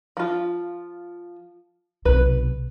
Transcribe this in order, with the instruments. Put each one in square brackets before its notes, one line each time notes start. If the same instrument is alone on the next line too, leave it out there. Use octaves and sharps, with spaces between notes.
[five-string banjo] F3 F4
[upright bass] B1 C3 [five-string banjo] B4